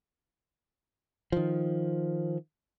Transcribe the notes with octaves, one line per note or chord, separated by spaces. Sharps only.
D#3 F3